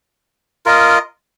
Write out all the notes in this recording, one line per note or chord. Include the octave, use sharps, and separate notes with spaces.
F4 A#4 D#5